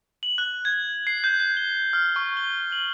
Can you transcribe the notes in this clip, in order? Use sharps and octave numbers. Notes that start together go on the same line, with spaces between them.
F#7
F#6
G#6
C7
G6
G6
G7
F6
C#6
G7
F#7